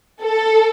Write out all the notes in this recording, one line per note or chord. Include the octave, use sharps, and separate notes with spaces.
A4